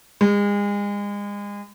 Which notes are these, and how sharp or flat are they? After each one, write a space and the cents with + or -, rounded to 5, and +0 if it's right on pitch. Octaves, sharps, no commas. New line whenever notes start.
G#3 -35